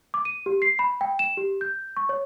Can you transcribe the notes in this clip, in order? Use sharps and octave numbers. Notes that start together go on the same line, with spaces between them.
D6
D#7
G4
C7
B5
G5
E7
G4
G6
C#6
C#5